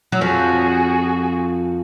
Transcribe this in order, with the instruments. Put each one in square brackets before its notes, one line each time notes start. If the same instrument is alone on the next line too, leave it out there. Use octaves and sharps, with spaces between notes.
[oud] F#3
[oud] F2 F3 [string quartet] F#4 G#4